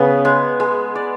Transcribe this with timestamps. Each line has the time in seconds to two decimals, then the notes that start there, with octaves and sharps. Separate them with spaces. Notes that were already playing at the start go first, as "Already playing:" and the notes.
Already playing: C#3 B3
0.25 G#3
0.60 G#3
0.95 D5